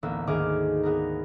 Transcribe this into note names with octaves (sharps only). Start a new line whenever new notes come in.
A1 D2 A#3 B3 E6
D2 G#2 D#3 G#4 D6 F6
B3 G#4 A#4